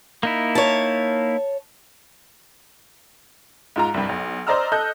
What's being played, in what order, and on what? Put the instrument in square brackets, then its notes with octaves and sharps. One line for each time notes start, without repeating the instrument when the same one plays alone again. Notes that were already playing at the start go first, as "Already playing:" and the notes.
[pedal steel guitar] A#3 D#4 E4
[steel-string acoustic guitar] C#5 A5
[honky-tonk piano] G#2 F4 A#5
C2 G2
B1
C5 D5 D#5 A#5 E6 F6
A4 D#5 F#6 G6